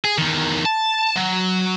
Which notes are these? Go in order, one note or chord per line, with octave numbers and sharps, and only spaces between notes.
G#4
E2 D#3
A5
F#3